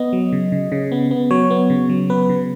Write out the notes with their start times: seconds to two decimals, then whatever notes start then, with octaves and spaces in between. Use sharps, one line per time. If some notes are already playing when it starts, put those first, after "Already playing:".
Already playing: B3 D#5
0.13 F#3
0.32 C#3
0.52 C#3
0.72 C#3
0.92 B3
1.11 B3
1.31 F#3 C#5
1.50 B3
1.70 C#3
1.89 F#3
2.10 B3 B4
2.29 C#3